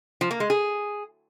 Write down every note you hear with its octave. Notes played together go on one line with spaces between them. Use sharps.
F3
A#3
G#3
G#4